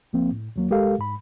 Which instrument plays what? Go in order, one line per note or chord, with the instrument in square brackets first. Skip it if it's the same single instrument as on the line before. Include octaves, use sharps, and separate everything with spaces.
[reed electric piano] C#2 F3 A#3 C4
A2
D#2 F#3 A#3
C2 G#3 G4 A4 A#4 F5
G#2 B5